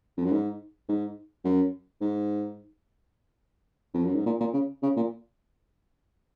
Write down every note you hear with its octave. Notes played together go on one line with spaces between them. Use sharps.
F2
F#2
G#2
G#2
F#2
G#2
F2
F#2
G#2
A#2
A#2
C#3
C#3
A#2